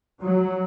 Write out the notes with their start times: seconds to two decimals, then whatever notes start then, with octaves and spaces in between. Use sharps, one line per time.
0.21 F#3